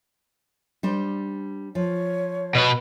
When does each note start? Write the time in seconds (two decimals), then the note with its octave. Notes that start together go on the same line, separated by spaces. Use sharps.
0.83 G3 D4 C5
1.75 F3 C#5
2.55 B2 B4